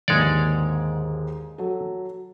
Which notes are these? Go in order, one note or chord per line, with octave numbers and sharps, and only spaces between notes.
D#2 G#2 D3 G#3 C#5 D5
F#3 A4